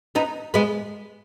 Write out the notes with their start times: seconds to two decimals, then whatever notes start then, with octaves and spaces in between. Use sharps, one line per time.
0.15 B3 D#4
0.54 G#3 B3